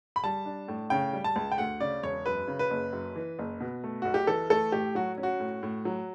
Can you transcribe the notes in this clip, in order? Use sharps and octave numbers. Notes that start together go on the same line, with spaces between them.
B5
G3 A5
D4
A2
C#3 G5
G3
A5
C#2
G5
D2 F#5
C#3 D5
E1 C#5
F#2 B4
C#3
B4
F#1
F#2
E3
F#1
B2
A3
B1 F#4
G4
E3 A4
A3 A4
A2 G4
F#3 F#4
C#4
F#4
A2
A2
F#3